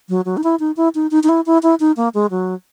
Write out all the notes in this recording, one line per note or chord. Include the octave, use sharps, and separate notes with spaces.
F#3
F#3
D#4
E4
D#4
E4
D#4
D#4
D#4
E4
E4
E4
D#4
A#3
G#3
F#3